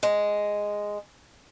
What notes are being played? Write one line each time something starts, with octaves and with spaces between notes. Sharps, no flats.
G#3